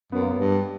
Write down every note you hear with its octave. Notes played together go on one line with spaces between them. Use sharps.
F#2 B3
A#3
B3
G2